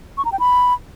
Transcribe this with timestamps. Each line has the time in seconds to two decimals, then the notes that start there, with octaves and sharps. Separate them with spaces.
0.18 C#6
0.25 A#5
0.32 G5
0.40 B5